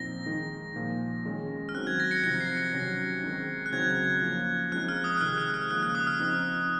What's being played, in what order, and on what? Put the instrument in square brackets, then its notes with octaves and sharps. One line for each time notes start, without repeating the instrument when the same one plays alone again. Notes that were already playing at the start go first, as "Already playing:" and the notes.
Already playing: [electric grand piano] A#2 F3 C4 D#4 [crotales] A#6
[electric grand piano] D#3 G#3 D#4
A#2 F3 A#3
D#3 G#3 C#4
[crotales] F6
[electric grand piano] D#3 F#3 C4 [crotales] F#6
[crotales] G#6
A#6
A#6 C#7
[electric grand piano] C3 F3 C4 D#4 [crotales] A#6 C#7
[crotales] C7
A#6
[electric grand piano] C3 D#3 F#3 C#4
D#3 G#3 C4 D#4
[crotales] F#6
[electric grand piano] C#3 F#3 C4 D#4 [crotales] G#6
[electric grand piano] F3 A#3 C#4
[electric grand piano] F3 G#3 C4 D#4 [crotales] F#6
[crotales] F6
D#6
F#6
[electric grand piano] C3 D#3 G#3 [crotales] F6
[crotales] F#6
F6
[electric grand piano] C#3 F3 A#3 D#4 [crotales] F#6
[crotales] F#6
D#6
F6
[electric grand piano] F3 C4 D#4